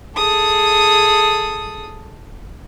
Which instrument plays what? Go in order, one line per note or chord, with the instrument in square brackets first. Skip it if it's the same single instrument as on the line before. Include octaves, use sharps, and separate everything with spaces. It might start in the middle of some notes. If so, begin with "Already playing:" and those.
[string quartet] G#4 A4 D#6